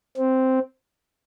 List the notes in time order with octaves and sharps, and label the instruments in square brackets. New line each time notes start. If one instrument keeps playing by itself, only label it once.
[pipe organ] C4